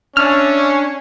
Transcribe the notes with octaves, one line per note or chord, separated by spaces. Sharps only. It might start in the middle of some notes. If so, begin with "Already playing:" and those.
C#4 D4 D5 E5 F6